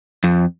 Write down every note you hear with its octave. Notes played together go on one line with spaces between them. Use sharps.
F2